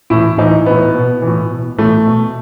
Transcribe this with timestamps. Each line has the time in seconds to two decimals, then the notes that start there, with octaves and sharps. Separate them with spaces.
0.10 A2 E3 E4
0.38 A2 E3 D#4
0.66 A2 E3 B3
0.94 B2
1.22 A2 E3
1.50 B2
1.78 A2 E3 A3
2.07 B2